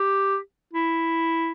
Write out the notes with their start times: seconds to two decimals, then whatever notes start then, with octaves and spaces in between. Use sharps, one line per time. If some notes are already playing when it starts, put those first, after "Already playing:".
Already playing: G4
0.73 E4